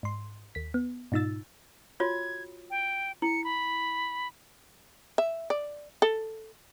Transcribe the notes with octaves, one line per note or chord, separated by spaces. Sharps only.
G#2 C6
D#2 B6
B3
G#2 B2 D#4 F4 E6 A6
F4 F#4 C#5 G#6
G5
E4 C#7
B5
E5
D5
A4